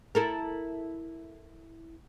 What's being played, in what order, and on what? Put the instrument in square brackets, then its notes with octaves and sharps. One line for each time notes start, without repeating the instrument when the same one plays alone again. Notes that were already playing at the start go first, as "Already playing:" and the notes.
[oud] E4 A4 A#4